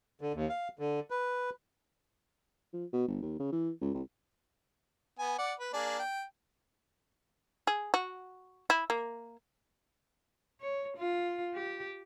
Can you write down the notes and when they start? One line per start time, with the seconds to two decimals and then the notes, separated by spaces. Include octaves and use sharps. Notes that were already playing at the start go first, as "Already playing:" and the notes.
0.21 D3
0.34 D#2
0.49 F5
0.79 D3
1.11 B4
2.73 F3
2.93 B2
3.08 G1
3.22 D#2
3.40 C#3
3.52 E3
3.82 C#2
3.94 C2
5.19 B3 G#5
5.38 D5 F#5
5.59 B4
5.73 A#3 D4 G#4
5.99 G5
7.67 G#4
7.94 F#4
8.70 E4
8.90 A#3
10.61 C#5
10.97 F4
11.55 G4